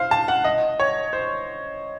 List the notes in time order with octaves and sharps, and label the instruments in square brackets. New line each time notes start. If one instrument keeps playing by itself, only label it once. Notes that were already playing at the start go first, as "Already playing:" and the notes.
Already playing: [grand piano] C5 F5
A5
F#5
D#5
C#5
C5